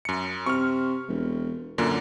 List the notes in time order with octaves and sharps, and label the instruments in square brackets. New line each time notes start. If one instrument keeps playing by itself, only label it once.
[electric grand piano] F#2 C#7
[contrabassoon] C3 [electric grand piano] C#6 F6
[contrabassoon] E1
[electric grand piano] F#2 D3 A#3 [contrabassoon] A#2